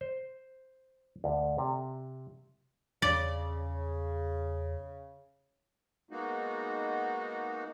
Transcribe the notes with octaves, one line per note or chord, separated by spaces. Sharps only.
C5
D2
C3
E2 C#3 D5
G#3 A#3 B3 D#4 F#4